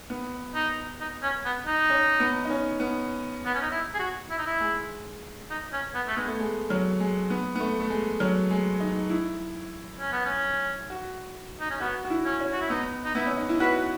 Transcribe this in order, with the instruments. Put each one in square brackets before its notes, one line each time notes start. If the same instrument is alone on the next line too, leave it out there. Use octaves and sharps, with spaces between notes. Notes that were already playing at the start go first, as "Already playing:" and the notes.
[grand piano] B3
[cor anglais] D#4
D#4
C#4
B3
D#4
[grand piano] C#4
B3
D#4
C#4
B3
[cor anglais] B3
C#4
D#4
E4
G#4
F#4
E4
D#4
E4
[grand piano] G#3
[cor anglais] D#4
C#4
B3
A3
[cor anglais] G#3 [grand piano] B3
[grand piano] A3
G#3
F#3
G#3
B3
B3
A3
A3
G#3
F#3
G#3
D#4
E4
[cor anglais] C#4
B3
C#4
[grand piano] F#4
[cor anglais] D#4
C#4
[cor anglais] B3 [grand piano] F#4
[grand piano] F#4
E4
[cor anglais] C#4
[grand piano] C#4
[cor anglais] F#4
E4
[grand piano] B3 [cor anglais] D#4
[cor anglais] D#4
[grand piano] B3 [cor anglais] E4
[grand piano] C#4
D#4
E4
[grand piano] F#4 [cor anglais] B4